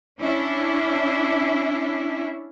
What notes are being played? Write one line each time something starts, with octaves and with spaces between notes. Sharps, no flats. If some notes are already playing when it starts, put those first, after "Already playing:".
C#4 D4 E4